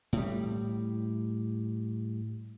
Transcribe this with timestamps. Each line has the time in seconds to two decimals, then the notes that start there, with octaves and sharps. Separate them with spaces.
0.13 A2 G3